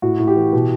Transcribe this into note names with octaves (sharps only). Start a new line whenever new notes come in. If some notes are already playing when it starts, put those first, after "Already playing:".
A2 F#4
A2
G4
E3
B2